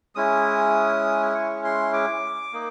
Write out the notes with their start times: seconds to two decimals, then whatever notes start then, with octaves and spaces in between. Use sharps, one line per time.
0.15 G#3 C#4 E4 D#6
1.35 C#6
1.64 C6
1.93 D6
2.53 A#3 D#4